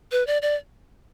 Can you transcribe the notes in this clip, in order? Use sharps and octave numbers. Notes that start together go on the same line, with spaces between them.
B4
D5
D5